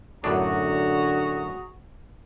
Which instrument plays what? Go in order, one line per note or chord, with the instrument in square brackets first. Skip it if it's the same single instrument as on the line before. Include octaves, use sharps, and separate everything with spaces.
[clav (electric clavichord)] F#2 A2 D4 [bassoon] D3 [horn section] F#4 G#4 A#5